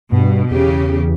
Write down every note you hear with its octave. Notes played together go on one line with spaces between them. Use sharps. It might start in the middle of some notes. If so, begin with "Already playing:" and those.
G2 B2
E2 C#3 G4